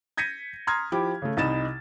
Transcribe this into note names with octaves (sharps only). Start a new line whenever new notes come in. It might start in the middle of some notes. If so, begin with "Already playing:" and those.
G6 G#6 A#6 B6 C#7 D#7
A#5 C6 D#6 F6 G#6
F3 E4 G4 D6
C#3 A3
C2 D#4 B5 A6 E7